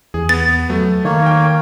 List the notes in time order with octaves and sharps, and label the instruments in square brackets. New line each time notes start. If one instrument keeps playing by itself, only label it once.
[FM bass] E2 [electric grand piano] G#4
[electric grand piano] B3 [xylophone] A6
[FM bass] F#3 [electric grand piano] A3
[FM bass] D#3 [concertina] A#3 C#5
[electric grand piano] A#4 G5